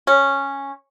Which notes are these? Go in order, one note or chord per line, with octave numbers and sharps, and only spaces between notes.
C#4